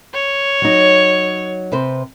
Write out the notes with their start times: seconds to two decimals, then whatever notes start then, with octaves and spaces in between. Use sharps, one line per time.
0.14 C#5
0.62 F#3 D#4
1.72 C3 B4 C5